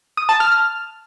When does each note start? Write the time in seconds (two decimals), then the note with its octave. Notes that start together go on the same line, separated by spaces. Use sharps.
0.17 D#6
0.29 A5
0.40 F6
0.52 F6